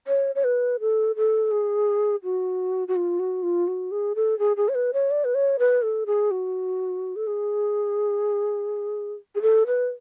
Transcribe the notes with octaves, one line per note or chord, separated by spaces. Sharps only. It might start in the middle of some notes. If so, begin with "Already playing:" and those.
C#5
C#5
B4
A4
A4
G#4
F#4
F#4
F4
F#4
F4
F#4
G#4
A4
G#4
G#4
C#5
B4
C#5
D5
B4
C#5
B4
A4
G#4
F#4
A4
G#4
G#4
A4
B4